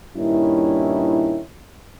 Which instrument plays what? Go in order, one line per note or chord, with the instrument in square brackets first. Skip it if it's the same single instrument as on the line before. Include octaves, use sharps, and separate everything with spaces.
[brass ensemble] G2 A#2 D#3 C#4 D4 E4